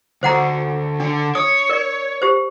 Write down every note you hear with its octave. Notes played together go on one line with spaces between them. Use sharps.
D2 C5 F#5 A#5
D3 D4
C#5 D#6
A#4 D5
G4 C5